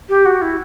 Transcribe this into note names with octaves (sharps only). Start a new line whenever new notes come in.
G4
F#4
E4